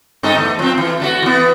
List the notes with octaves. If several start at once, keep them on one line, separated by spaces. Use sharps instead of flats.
G2 D#4 A4
E2 A3
F3 C4
E3
A3 D4 F#4
E3 B3